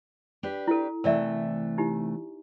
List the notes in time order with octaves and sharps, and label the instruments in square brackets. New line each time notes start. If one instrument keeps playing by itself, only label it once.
[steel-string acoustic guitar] D4 G4 B4
[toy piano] E4 A4
[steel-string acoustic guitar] C3 E3 A3 [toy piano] A#4 D5 E5
[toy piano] D#4 E4 G4